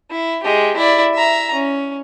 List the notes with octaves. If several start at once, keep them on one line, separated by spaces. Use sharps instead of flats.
E4
G#3 G4
E4 D5
E5 A#5
C#4